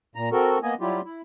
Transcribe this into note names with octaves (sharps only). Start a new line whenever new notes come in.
A#2 A#5
C4 F#4 A4 A#4
A#3 B3 D#5 G#5
F#3 G3 E4 F4 G4
E4